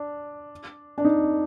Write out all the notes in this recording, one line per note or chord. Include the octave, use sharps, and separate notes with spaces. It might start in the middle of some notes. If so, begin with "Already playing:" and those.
Already playing: D4
D4
D#4